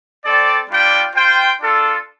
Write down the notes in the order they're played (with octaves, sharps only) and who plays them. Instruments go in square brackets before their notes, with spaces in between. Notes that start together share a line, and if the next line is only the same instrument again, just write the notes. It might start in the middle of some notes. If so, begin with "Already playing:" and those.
[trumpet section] C4 A4 D5
G3 D4 F4 D5 G5
F4 C5 G5
D4 F4 A4